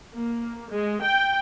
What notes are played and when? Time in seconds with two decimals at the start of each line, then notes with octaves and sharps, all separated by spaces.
0.14 A#3
0.71 G#3
1.02 G5